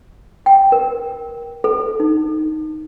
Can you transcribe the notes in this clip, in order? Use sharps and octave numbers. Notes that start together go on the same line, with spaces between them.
G5
A#4
A4
D#4